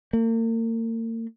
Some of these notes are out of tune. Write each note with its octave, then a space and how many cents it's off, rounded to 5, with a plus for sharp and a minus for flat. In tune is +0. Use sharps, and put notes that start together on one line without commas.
A#3 -40